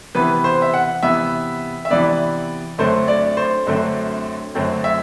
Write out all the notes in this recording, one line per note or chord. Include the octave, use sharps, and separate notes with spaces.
C3 E3 B3 B4
C5
E5
F#5
C3 E3 B3 E5
E5
C3 E3 B3 D5
F#2 D3 F#3 A3 C4 C5
D5
C5
F#2 D3 F#3 A3 C4
F#2 D3 F#3 A3 C4
E5